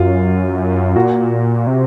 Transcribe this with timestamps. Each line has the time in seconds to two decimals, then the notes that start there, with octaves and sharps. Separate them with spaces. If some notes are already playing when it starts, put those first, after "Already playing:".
Already playing: F#2 F4
0.96 A#2 F#4
1.67 C3